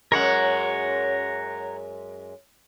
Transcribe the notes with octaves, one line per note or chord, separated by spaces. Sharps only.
F#2 A2 G#3 A#4 C#5 F#5